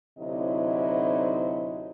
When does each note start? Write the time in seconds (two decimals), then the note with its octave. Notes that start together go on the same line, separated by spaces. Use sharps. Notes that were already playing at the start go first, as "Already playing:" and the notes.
0.19 D2 C3 F#3 D#4 E4 D#5